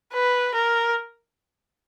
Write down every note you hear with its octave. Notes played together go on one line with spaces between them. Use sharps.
B4
A#4